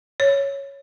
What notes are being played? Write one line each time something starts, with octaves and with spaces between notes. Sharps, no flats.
C#5